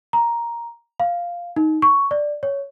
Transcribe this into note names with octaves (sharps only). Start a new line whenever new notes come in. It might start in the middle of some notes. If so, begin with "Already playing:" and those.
A#5
F5
D#4
C#6
D5
C#5